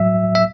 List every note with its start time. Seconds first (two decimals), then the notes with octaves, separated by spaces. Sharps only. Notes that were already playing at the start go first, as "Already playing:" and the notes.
Already playing: A2 F#3 E5
0.35 E5